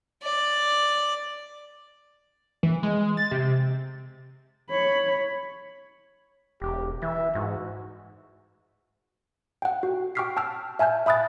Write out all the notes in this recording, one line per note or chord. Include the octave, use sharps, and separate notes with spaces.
D5
E3
G#3
A6
C3
C#5 B5
E1 G4
E3 E5
G#2 F#4
F#5 G5
F#4
G5 C#6 D6 F6 B6 C7
G5 A5 E6 F6
E5 G#5 A5 F6 G6
E5 B5 D#6 F#6 A6